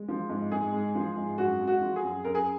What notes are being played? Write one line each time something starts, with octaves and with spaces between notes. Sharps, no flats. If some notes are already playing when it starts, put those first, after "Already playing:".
Already playing: G#3
F3
G#2
G#2 G#4
G#3
F3
G#2
F#2 F#4
G#3
F#4
F3
G#4
F#2
F#2 A#4
G#4